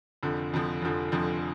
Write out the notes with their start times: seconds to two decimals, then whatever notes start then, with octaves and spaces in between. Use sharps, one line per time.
0.23 F1 F2 D3 F3
0.52 F1 F2 D3 F3
0.82 F1 F2 D3 F3
1.12 F1 F2 D3 F3